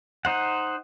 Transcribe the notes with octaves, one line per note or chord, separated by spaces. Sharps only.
D#4 C5 F#5